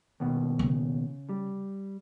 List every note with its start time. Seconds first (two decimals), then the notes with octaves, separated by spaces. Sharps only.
0.20 D#2 B2
0.59 C#3
1.29 G3